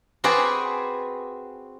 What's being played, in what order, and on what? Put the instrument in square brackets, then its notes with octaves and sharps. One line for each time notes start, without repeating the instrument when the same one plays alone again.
[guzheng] C4 F#4 G#4 B4 D5 G#5